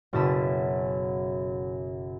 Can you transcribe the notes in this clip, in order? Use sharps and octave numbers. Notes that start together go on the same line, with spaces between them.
F#1 F#2 B2 A5 D#6 B6